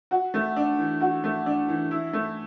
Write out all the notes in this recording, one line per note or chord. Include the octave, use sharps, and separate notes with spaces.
F#4
A3
D4
E3
F#4
A3
D4
E3
E4
A3